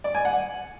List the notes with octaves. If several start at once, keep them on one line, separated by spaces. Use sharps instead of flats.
D5
G#5
F#5